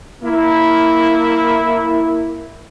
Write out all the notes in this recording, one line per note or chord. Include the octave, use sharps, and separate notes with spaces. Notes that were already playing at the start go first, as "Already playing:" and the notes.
A#3 E4